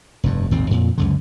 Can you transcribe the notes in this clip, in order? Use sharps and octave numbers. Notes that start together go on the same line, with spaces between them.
F1 G2
G#1 D#2 A#2 C4
F2 A#2
C#2 F#2 D3